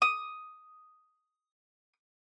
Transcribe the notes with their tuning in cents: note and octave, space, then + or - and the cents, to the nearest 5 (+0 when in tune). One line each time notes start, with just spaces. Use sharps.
D#6 +5